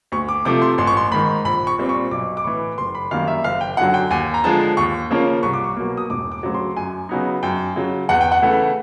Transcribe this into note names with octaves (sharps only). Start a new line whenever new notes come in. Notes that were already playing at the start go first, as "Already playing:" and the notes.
D2 C#6
D6
C3 F3 A3 D6
C6
A1 C6
C#6
C6
G#2 D#3 B5
A#1 B5
C#6
A#2 G3 C4
C#6
B1 D6
D6
A2 E3 C#6
F#1 C6
B5
F#2 D#3 G3 A#3 F5
E5
F#1 F5
G5
F#2 D3 F#3 F#5
G5
D#2 G#5
A#5
D3 F3 G#3 A5
D#2 C#6
C#3 F3 A#3 C#4
C2 C#6
D6
C#6
B2 F#3 A#3
D#6
E1 D6
D6
D2 C#3 F#3
C6
F#2 G#5
C#3 F#3 B3 D#4
F#2 G5
C#3 F#3
E2 F#5
G5
F#5
C#3 E3 A3